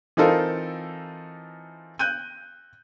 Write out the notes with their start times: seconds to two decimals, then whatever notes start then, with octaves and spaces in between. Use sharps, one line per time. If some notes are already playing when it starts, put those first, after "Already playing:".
0.17 E3 C4 D#4 F4 A4 A#4
1.99 F#6 G6 D#7